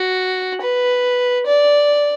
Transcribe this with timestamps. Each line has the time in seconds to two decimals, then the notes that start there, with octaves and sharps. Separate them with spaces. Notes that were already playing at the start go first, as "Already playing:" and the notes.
Already playing: F#4
0.61 B4
1.46 D5